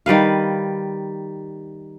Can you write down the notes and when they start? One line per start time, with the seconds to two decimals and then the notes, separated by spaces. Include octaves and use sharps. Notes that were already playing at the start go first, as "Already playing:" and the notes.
0.06 D#3 G3 B4 F5